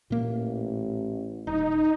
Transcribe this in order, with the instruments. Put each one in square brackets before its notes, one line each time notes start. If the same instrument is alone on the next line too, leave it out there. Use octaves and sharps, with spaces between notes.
[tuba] A1 [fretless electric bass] A#2 A#3
[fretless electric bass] D#1 [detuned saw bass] D#4